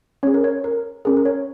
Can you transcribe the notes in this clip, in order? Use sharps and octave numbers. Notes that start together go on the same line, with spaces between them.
C#4 G#4 C#5
A#4
C#5
A#4
C#4 G#4 A#4
A#4
C#5